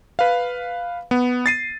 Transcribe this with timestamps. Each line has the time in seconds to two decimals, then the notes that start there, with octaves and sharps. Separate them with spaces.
0.19 B4 F5
1.11 B3
1.46 A6 C7 D#7